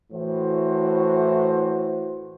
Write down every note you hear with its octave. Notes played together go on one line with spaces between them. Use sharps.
A2 E3 F#4 C5